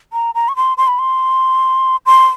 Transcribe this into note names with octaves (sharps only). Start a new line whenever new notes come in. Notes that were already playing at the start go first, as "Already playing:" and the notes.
A#5
A#5
C#6
C6
C6
B5
C6
C6